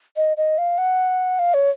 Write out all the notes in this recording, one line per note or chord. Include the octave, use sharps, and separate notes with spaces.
D#5
D#5
F5
F#5
F5
C#5